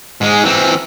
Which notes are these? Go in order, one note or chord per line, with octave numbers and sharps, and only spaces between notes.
G#2 G#3
E3 C4